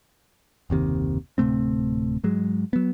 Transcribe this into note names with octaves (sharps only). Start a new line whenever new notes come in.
F#1 D#2 C3 D#3
D1 C3 A3 C4
G#2 F#3 G#3
F#3 B3